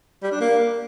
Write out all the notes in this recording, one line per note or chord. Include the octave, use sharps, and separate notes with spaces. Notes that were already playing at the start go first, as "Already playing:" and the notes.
G3
D4
A#3